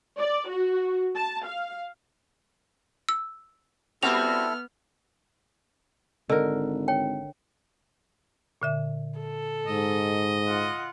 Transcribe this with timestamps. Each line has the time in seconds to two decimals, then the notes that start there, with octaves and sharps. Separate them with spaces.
0.18 D5
0.48 F#4
1.15 A5
1.45 F5
3.09 E6
4.03 G3 B3 C4 E4 F#4 A4 F6 F7
6.29 G#1 D3 A#4 D#5
6.88 C#5 G5
8.62 A#2 D3 E5
9.19 A4
9.67 G#2 D#5
10.46 F4 F#5